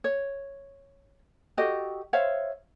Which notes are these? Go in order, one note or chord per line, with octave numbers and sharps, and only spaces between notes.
C#5
F#4 G4 A4 D#5
C5 C#5 E5 F5